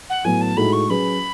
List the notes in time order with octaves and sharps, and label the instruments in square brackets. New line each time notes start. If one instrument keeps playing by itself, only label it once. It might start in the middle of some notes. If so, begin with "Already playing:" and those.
[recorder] F#5
[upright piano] A2 F#3 B3 [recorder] G#5
[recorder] A5
[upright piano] A2 G#3 D#4 F#4 A4 [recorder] B5
[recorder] C#6
[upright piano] F#3 C#4 G#4 B4 [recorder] B5